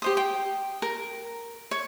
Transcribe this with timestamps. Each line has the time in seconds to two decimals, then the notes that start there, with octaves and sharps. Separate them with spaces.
0.02 G4 C5 D#6
0.17 G5
0.82 A#4
1.71 C#5